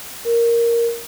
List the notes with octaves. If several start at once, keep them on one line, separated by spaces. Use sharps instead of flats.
A#4